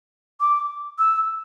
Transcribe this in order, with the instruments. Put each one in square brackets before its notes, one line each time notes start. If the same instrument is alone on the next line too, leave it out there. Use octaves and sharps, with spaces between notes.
[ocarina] D6
E6